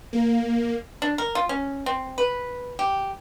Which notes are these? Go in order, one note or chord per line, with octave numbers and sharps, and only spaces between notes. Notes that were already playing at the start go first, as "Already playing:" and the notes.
A#3
D4
A#4
F4
C#4
C4
B4
G4